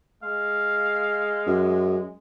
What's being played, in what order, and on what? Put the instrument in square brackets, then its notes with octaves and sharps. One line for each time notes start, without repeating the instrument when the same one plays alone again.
[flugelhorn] G#3 [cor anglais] F5
[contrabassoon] F#2